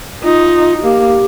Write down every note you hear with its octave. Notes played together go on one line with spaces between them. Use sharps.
D#4 F4
F4
A#3 G4